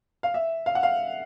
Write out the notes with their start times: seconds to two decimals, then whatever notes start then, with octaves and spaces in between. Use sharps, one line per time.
0.23 F5
0.34 E5
0.66 F5
0.75 F#5
0.83 F5